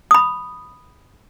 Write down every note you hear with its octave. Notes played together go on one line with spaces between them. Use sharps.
B5 D#6